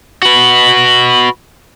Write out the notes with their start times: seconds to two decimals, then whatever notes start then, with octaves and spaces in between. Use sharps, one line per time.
0.22 F#4 B4